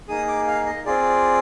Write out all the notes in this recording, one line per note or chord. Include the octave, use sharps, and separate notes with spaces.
A#3 D#4 G#4 D#6
D6
F5
D#5
C4 F4 G#4 D5